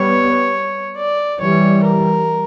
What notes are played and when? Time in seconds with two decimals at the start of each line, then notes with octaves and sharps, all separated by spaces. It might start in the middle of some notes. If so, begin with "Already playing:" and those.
Already playing: G3 B3 C#5
0.97 D5
1.40 E3 G3 C#5
1.84 A#4